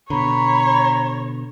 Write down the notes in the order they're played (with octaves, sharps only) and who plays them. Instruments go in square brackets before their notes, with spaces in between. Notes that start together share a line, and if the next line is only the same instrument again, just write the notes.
[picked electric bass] B2 D3 [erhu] C#5 [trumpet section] A#5 [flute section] B5